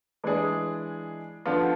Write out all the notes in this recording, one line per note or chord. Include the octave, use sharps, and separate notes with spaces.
E3 G#3 D4 G#4
D3 F3 B3 F4